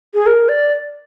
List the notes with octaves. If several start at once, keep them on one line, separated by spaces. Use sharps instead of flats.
G#4
A#4
D5